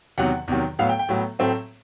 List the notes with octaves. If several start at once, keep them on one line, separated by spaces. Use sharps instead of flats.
E2 C3 D#3 F#3 F#5
E2 C3 D#3 F#3
A2 F#3 B3 F5
G5
G5
A2 F#3 B3
A2 F#3 A3 C4